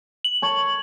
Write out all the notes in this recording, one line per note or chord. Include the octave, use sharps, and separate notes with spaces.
F#7
C#5 A5